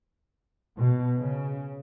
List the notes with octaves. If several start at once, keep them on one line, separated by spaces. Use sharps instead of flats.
B2
C#3